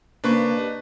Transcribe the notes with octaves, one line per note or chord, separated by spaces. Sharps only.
C#3 A#3 D4 B4 C5 C#6
G4 D#5